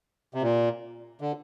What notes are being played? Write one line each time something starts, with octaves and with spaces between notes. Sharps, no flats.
C3
A#2
D3